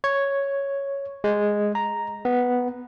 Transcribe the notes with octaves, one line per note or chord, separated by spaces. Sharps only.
C#5
G#3
A#5
B3